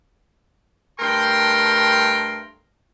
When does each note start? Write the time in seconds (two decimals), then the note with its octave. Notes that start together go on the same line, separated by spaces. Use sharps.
1.00 G2 A3 A#4 G5 C6